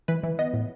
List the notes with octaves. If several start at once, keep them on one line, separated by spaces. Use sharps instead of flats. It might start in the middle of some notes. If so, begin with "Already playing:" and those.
E3 B4
E3
B3 D#5
A2